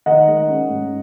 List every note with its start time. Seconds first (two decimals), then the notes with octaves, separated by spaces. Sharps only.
0.06 D#3 D#5 F#5
0.27 G#3
0.48 C#4
0.70 G#2